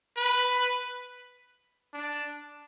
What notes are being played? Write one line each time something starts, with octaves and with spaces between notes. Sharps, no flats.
B4
D4